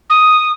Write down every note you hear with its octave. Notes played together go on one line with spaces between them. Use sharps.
D#6